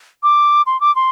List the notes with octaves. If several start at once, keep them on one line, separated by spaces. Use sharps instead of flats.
D6
C6
D6
C6